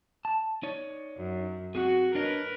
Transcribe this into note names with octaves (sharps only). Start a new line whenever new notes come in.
A5
D#4 C#5 D5
F#2
C4 F#4 G#4
D4 A#4 B4 C#5 D#5